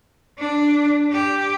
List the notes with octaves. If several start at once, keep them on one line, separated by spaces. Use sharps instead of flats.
D4
G4